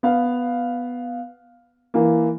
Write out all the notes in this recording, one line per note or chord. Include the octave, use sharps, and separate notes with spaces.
B3 F5
E3 A#3